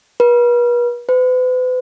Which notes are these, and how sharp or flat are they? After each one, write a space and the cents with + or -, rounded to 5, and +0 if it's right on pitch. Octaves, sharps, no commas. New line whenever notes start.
B4 -40
B4 +40